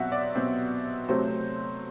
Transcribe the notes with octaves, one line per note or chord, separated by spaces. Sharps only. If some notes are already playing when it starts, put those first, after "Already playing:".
Already playing: B2 F#3 C4 E5 F#5
D5
B2 F#3 C4
C3 F#3 A3 C4 C5